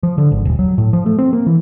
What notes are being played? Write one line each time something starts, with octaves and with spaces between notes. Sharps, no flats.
F3
D3
G#1
D#1
F#3
A2
F3
A3
C4
A#3
E3